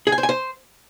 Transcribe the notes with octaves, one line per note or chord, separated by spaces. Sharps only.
G#4
G#5
C5
G#5
C5